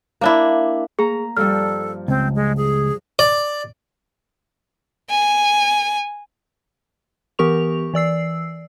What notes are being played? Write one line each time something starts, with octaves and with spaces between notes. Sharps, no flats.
A#3 D4 E4
A#3 G#4 A#5
G2 F3 G3 A4 F6
C#2 C4
G#3
G#4
D5
G#5
E3 B3 G4 A#4 C#6 F7
E3 D5 E6 C7